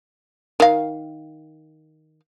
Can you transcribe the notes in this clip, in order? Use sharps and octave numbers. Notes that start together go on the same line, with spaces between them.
D#3 F5